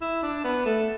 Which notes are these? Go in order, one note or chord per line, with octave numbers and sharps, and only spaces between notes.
E4
D4
B3
A3